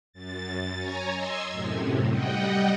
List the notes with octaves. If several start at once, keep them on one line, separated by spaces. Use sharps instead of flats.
F#2 A6
C#5 G#5 A#5
D#5 C6 E6 G#6
F#2 A2 C3
G3 D#5 F#5 G5